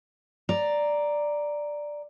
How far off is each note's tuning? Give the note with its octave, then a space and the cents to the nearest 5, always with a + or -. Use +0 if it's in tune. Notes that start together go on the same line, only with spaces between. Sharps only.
D5 +0 A#5 +0